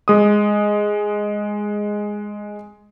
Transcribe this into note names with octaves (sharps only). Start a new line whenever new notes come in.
G#3 D#6